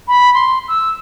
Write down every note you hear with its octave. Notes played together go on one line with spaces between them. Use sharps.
B5
C6
E6